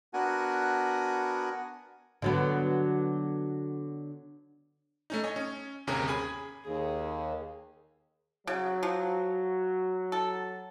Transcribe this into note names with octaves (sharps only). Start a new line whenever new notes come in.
B3 D4 F#4 A#4 F#5 G#5
D3 F#3 B3
A3 C#4 D#4
C#5 D#5 G#5
C#4
G1 D#2 C3 C#4 G#4 A#4
G#4 G#5 B5
D#2 G#4
C#3 F#3
F3
A4